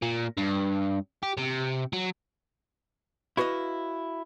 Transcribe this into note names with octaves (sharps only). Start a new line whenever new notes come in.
A#2
G2
G4
C3
F#3
E4 F#4 B4 C5 D#5 F5